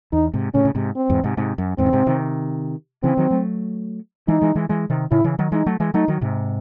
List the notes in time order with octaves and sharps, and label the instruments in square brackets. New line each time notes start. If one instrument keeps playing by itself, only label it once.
[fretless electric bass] E2 [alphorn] D#4
[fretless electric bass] G#2 C3
[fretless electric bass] A2 C#3 [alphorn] C#4
[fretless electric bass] C#3
G#2 C3
[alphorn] C4
[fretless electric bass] E2 G#2
G#2 C3
G#2 C3
F#2
[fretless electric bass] E2 G#2 [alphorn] C4
[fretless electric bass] C#3
G#2 C3
C3 D#3
[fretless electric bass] C#3 E3 [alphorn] C4
[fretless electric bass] D#3 F#3
F#3 A3
[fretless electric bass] E3 G#3 [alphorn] D#4
[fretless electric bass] E3 G#3
E3 G#3
E3 G#3
C3 D#3
[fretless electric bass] A2 C#3 [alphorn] E4
[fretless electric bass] C#3 E3
D#3 F#3
[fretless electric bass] E3 G#3 [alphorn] D#4
[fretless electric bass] F#3 A3
E3 G#3
[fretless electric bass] F#3 A3 [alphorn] D#4
[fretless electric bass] D#3 F#3
G#2 C3